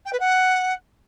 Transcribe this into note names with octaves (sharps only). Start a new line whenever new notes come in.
G5
B4
F#5